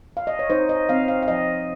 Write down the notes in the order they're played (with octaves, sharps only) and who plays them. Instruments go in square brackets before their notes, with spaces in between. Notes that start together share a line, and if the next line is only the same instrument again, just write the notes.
[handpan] F5
D#5
C#5
D#4 C5
D#5
C4 F5
F5
F5
F3 D#5